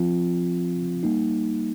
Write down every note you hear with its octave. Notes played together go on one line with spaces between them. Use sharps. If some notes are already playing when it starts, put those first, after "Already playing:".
Already playing: F3 C4 F4
G3 A#3 D#4